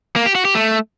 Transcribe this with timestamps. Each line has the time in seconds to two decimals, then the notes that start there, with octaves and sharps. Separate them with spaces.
0.16 A#3
0.26 G4
0.35 F#4
0.45 G4
0.55 A3